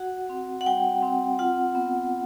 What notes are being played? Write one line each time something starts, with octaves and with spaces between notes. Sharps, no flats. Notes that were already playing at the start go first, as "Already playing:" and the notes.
Already playing: F#4 F#5
C4
F#5
G3 G5
C4
F4 F#5
B3